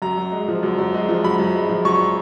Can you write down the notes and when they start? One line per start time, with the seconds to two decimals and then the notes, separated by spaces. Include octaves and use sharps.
0.02 F#2 A#5
0.17 F#2
0.32 G#3
0.48 F3
0.63 F#2
0.78 F#2
0.94 G#3
1.09 F3
1.24 F#2 B5
1.39 F#2
1.55 G#3
1.69 F3
1.85 F#2 C#6